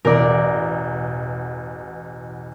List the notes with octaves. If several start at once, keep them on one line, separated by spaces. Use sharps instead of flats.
A1 E2 B2 A#4 D5